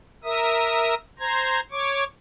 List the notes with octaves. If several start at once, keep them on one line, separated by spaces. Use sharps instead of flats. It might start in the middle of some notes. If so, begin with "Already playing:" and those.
A#4 E5 D#6
C5 A#5 G#6
C#5 C#6 D6